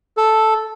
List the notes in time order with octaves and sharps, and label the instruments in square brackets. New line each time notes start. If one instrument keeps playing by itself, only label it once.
[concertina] A4